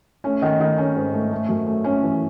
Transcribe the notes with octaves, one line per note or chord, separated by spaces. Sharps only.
A3 C#4
D#3 D#4
D#3 D#4
D#3 C#4
G#2
A3
A3
F#2
A3
A3 C#4
E3